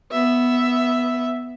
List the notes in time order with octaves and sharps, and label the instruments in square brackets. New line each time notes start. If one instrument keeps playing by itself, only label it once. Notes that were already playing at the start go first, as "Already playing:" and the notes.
[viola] B3 E5